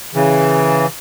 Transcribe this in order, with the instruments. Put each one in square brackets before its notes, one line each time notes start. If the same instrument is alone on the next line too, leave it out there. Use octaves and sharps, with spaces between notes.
[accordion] C#3 E3